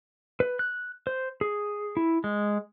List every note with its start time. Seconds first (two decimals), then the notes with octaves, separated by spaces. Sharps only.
0.40 B4
0.59 F#6
1.07 C5
1.41 G#4
1.97 E4
2.24 G#3